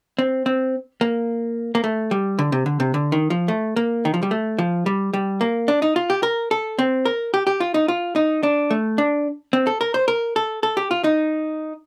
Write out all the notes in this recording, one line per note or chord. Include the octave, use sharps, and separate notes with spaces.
C4
C4
A#3
A#3
A3
G3
D3
C3
D3
C3
D3
D#3
F3
A3
A#3
D#3
F3
G3
A3
F3
G3
G3
A#3
D4
D#4
F4
G4
A#4
A4
C4
A#4
G4
G4
F4
D#4
F4
D#4
D4
A3
D4
C4
A4
A#4
C5
A#4
A4
A4
G4
F4
D#4